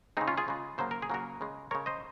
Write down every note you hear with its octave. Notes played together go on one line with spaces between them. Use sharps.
C#3 G#3 C4 D#4
C#4 F4
F4 G#4
C#3 G#3
C#3 F#3 A#3 C5
A#4
G#4
C#3 F#3 A#3 F#4 A#4
C#3 G#3
C#3 G#3 A#4 C#5
C5 D#5